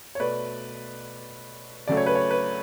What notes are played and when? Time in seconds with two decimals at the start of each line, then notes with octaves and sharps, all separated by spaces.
0.15 C#5
0.19 B2 A3 B4 D5
1.88 C#3 F#3 A3 D5
1.97 C#5
2.06 B4
2.15 C#5
2.31 B4